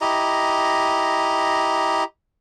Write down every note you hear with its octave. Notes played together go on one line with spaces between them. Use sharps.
E4 G4 D#5 A#5